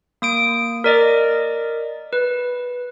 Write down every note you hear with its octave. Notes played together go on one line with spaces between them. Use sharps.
A#3 D#6 D7
A#4 D5 D#5
B4